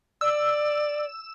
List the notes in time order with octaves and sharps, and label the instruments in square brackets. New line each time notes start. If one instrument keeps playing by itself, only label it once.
[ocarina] D5 [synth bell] E6